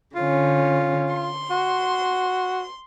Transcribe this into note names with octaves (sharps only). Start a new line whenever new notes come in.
D3 C#4 F4
C6
F#4